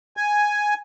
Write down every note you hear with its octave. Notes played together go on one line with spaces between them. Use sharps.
G#5